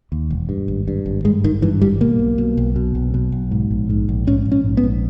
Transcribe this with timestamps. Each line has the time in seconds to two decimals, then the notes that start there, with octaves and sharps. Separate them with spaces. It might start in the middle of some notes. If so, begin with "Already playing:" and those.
0.12 D#2
0.31 E1
0.49 G2
0.68 G#1
0.88 G2
1.06 G#1
1.25 G2 G#3
1.44 G#1 D#3
1.62 G2 E3
1.82 G#1 G3
2.01 B2 A#3
2.19 B1
2.38 B2
2.57 B1
2.76 B2
2.95 B1
3.14 B2
3.32 B1
3.51 G#2
3.71 A#1
3.90 G#2
4.09 A#1
4.27 G#2 C#4
4.46 A#1
4.52 C#4
4.64 G#2
4.77 B3
4.83 A#1